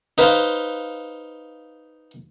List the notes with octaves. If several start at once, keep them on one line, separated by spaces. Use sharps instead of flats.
D#4 B4 C5 F5